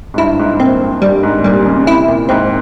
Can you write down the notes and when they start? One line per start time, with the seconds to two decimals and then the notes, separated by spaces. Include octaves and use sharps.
0.14 G#2
0.18 G2 E4
0.39 G#2
0.54 G#2
0.60 A#2 C4
0.81 F2
1.02 G2 G3
1.23 G#2
1.44 A#2 G3
1.66 C#3
1.79 C#3
1.86 C3 E4
2.08 A#2
2.29 G#2 C4